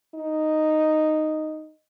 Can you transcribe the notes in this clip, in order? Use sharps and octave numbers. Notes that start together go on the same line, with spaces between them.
D#4